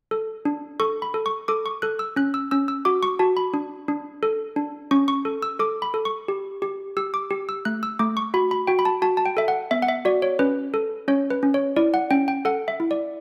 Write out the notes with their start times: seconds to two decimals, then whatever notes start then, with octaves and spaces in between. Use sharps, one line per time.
0.11 A4
0.45 D4
0.80 A4 C#6
1.02 B5
1.14 A4
1.26 C#6
1.48 A4 D6
1.66 C#6
1.82 A4 F#6
1.99 E6
2.16 C#4 F#6
2.34 E6
2.51 C#4 E6
2.68 E6
2.85 F#4 D6
3.03 C#6
3.19 F#4 A5
3.37 B5
3.54 D4
3.88 D4
4.23 A4
4.56 D4
4.91 C#4 C#6
5.08 C#6
5.25 A4
5.43 E6
5.59 A4 D6
5.82 B5
5.94 A4
6.05 C#6
6.28 G4
6.62 G4
6.97 G4 E6
7.14 D6
7.30 G4
7.49 E6
7.65 A3 F#6
7.83 E6
7.99 A3 D6
8.17 C#6
8.34 F#4 B5
8.51 B5
8.67 F#4 G5
8.79 B5
8.85 A5
9.02 F#4 A5
9.17 A5
9.26 G5
9.37 A4 E5
9.48 F#5
9.71 B3 E5
9.82 F#5
9.88 E5
10.05 F#4 D5
10.22 C#5
10.39 C#4 B4
10.74 A4
11.08 C#4 C#5
11.30 B4
11.43 C#4
11.54 C#5
11.76 E4 D5
11.94 F#5
12.11 C#4 G5
12.28 G5
12.45 A4 F#5
12.68 E5
12.80 E4
12.91 D5